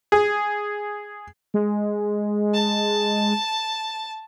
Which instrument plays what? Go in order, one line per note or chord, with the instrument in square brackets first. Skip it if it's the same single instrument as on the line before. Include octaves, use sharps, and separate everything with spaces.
[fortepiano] G#4
[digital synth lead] G#3
[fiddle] A5